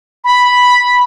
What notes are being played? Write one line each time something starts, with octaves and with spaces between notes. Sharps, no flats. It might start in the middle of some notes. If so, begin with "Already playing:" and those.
B5